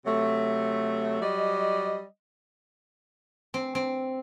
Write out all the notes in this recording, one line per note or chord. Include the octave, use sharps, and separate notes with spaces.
C3 F#3 A3
F#3 G3 D5 D#5
C4
C4